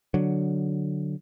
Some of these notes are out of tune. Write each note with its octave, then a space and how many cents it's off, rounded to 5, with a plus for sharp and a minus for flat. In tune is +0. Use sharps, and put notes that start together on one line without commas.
D3 +0 F#3 +0